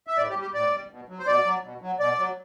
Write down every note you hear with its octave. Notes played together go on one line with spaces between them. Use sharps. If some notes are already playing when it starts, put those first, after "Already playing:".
E5
A2 D5
G4
G3
G4
A2 D5
G3
B2
F#3
C5
B2 D5
F#3
B2
F#3
B2 D5
F#3